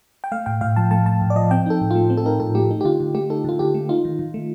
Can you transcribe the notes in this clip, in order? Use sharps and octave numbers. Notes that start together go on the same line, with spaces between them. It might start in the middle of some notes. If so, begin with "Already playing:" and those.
G5
A3 F5
A2 G5
A2 F5
F3 A5
A3 A5
A2 A5
A2
D5
F3 D#5
C4 G5
D#4 A4
A2
A3 F4
C4
A4
D#4 A#4
A2 A4
A3 G4
D#4
G4
D3 F4
D3
A3 G4
D#4 A4
D3 F4
D3 G4
A3
D#4 F4
D#3
D#3
A3